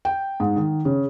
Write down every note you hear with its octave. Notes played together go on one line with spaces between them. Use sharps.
G5
G#2
D#3
C#3